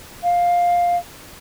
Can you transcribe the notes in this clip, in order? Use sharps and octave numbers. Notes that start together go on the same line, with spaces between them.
F5